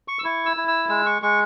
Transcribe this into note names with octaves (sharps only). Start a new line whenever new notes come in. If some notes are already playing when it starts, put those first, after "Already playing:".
C#6
E6
E4 C#6
E6
E4
E6
G#3 E6
C#6
G#3 C#6